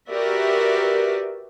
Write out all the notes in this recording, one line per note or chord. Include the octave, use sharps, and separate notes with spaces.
F#4 G4 A#4 B4 D5 E5